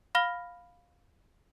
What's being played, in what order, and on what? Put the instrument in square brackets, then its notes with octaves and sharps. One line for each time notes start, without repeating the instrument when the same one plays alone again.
[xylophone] F5 B5 F6 A#6 G7